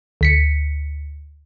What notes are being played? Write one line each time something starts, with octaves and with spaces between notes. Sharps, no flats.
D2 B6 C#7